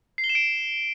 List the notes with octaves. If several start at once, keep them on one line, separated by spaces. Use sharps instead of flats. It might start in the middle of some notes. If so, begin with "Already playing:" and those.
C7
G7
E7
D7